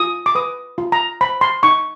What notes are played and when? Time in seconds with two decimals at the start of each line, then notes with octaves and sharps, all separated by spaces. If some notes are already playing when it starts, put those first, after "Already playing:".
Already playing: F4 D#6
0.26 D6
0.35 B4 D#6
0.78 F4
0.92 A#5
1.21 C5 B5
1.41 C6
1.63 D#4 C#6